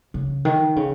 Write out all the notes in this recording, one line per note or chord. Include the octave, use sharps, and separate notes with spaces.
C#3
D#3
C#3